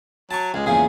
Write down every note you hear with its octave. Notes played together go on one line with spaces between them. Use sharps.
F#3 A5 C#6
C#2 G#3
E2 A#2 C#3 G#4